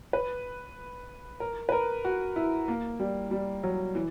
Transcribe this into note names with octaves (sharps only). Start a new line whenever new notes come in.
B4
A#4
B4
A#4
F#4
E4
A#3
G3
G3
F#3
E3